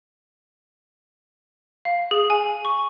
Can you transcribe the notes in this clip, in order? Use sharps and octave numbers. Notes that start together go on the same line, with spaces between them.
F5
G#4
G#5
C#6